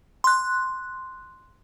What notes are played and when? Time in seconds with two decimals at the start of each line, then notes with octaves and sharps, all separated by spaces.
0.24 C6 F#6